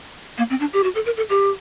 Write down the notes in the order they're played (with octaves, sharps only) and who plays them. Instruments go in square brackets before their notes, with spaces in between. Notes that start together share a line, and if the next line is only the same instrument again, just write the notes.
[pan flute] A#3
C4
D4
G4
F#4
A4
A#4
A4
G4